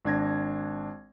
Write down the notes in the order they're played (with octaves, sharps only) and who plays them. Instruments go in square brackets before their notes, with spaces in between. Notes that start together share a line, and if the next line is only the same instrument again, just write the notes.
[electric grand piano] G#1 D4 G#6 A#6